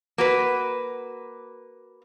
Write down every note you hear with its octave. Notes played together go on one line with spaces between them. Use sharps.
A#3 F#4 B4